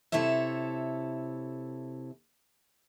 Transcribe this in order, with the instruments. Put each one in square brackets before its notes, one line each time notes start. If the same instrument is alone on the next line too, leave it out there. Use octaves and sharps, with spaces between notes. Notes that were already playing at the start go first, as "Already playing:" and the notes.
[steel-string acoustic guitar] C3 E4 A4 C#5 E5